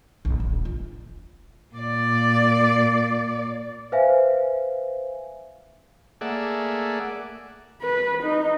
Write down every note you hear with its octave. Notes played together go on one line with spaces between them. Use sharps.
A#1
D#1
F4
A#2 D5
B4 C5 E5 F5 G#5
A3 A#3 G#4 D5 E5 F#5
B4
D#4